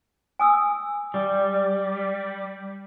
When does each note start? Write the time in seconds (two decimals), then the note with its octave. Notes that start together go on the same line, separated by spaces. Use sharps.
0.39 G#5 D#6 E6
1.14 G3